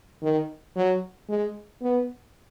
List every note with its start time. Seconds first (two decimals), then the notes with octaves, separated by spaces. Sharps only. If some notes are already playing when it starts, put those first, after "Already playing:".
0.22 D#3
0.76 F#3
1.29 G#3
1.82 B3